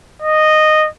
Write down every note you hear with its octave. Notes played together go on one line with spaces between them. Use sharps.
D#5